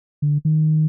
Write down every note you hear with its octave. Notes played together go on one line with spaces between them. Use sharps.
D3
D#3